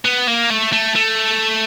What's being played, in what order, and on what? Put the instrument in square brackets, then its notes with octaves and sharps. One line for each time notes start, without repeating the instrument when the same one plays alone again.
[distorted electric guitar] B3
A#3
A3
A3
A3